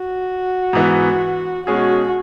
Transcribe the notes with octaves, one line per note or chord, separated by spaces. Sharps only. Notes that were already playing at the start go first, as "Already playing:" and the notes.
Already playing: F#4
G#2 E3 B3
B2 G#3 C#4 F#4 G#4